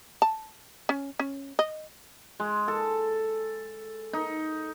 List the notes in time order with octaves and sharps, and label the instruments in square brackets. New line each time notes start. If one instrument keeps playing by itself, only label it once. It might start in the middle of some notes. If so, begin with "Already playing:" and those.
[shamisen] A5
C#4
C#4
D#5
[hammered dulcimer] G#3
A4
D#4